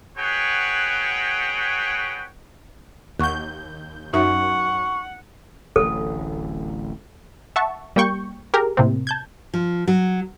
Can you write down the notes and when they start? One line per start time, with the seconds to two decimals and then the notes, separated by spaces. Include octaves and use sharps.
0.18 F#4 G#4 B4 C#5 F#5 G5
3.19 D#2 F#5 C#6 F#6 G6
4.14 F#2 D#4 F#4 E5 F#5 C#6
5.76 D1 A1 A4
7.56 E5 F#5 A5 C#6
7.96 G3 A#3 G5 C#6 G6
8.54 G4 G#4 A#4
8.77 A2 C3 A#3 C4
9.07 A5 G6 G#6
9.54 F3
9.88 F#3